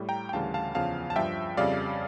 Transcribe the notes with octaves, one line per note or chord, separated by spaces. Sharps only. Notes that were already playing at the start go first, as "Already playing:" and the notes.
Already playing: A2 G3
G5 A#5
G5
D2 C#3 E3 G3 F5 A5
F5 A5
E2 C#3 F3 F5 A5
A5
G2 F3 E5 G5
F2 C#3 G3 D5 F5